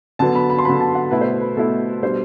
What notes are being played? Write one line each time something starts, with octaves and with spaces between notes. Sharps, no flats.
D3 F#3 B3 A5
B5
B5
C6
D3 F#3 B3 B5
A5
F#5
B2 A3 E4 B4
C5
B4
B4
B2 A3 E4 A4
B2 G3 D4 C5